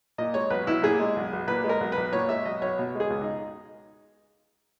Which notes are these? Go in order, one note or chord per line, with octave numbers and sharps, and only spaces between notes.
A#2 D#5
G#3 C#5
B1 B4
B1 E4
A#2 G#4
G#3
B1
B1
A#2 B4
G#3
A#4
B1
B4
B1
A#2 C#5
G#3 E5
B1 D#5
B1 C#5
B2
G#3
G#4
C#2
D#4